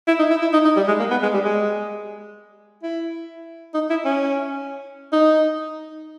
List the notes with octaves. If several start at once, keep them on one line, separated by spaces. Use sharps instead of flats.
E4
D#4
E4
E4
D#4
D#4
G3
G#3
A#3
B3
G#3
G3
G#3
E4
D#4
E4
C#4
D#4